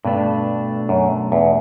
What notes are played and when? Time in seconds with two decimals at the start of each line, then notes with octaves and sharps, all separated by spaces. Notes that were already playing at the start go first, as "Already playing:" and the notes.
0.05 G2 B2 A3 D4
0.89 F#2
1.32 E2